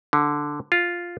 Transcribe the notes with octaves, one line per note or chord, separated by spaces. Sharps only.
D3
F4